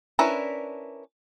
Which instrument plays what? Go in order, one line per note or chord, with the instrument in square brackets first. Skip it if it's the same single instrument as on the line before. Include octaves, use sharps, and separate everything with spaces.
[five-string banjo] C#4 D4 E4 A#4 B4